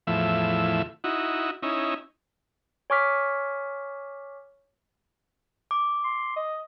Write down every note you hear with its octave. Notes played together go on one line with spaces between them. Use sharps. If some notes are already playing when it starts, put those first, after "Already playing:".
E2 A2 F3 E5
D#4 E4 F#4
C#4 D#4 E4
C#5 G#5 C#6 D6 F6 B6
D6
C6
D#5